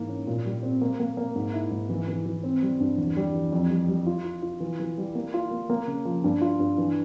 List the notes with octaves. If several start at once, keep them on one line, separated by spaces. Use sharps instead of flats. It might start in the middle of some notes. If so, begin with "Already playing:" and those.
Already playing: G#2 E3 A#3
C#4
A#2
G3
C4
A#3
A#3
A#3
G#2
E4
G#2
E3
E3
E3
C4
G3
G2
E2
G3
E3
F2
G3
G3
F4
F4
F4
E3
E3
G3
A#3
F4
A#3
A#3
C#3
F3
G2
F4
G2
E3